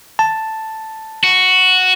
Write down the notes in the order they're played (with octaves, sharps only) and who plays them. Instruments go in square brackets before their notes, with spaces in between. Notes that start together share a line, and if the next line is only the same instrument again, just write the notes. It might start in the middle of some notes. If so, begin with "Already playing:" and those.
[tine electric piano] A5
[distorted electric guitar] F#4